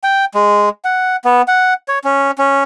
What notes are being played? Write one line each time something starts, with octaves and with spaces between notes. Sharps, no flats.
G5
G#3
F#5
B3
F#5
C#5
C#4
C#4